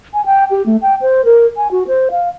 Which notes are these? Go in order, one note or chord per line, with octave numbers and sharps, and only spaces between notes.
G#5
G5
G4
A3
G5
C5
A#4
G#5
F#4
C5
F5